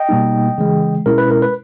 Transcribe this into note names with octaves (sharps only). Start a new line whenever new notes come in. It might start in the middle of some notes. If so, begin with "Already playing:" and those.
Already playing: D#5 G5
B2 G3 A#3 D#4
C#3 E3 G#3
B2 G#3 C#4 E4 A#4
B4
A#4
B4